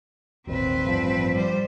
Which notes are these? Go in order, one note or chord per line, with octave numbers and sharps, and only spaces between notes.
D#1 G#1 D#2 C4 B4
A1 G2 F3
G3 C5